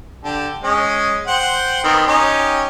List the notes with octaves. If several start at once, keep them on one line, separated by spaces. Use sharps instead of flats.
D3 G4 A5
G#3 C#4 D#5
C5 F#5 G5
D#3 B3 C4
C#4 D#4 G4